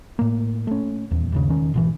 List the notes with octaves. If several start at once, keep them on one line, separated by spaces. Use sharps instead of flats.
A2 A#3
A3 C#4
D#1 E2
G1 D#2 C#3
E1 D#3 C#4
G#1 B2 E3